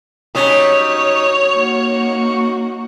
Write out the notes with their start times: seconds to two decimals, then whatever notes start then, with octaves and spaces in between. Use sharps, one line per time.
0.35 F#3 G3 C#4 D#4 C#5
1.53 A#3 D#4 F#4 C#6